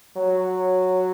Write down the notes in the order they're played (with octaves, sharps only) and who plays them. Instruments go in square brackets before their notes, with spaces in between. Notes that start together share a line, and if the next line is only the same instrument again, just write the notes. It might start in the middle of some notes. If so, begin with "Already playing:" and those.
[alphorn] F#3